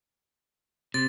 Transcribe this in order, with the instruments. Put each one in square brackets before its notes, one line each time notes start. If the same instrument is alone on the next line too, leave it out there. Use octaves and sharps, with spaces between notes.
[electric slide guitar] C3 [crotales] A6